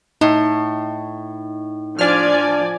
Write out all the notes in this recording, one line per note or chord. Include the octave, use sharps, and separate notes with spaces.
A2 D#4
F3 D4 D5 G#5 F6